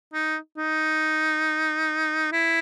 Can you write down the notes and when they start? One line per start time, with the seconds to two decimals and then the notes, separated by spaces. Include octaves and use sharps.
0.14 D#4
0.57 D#4
2.32 E4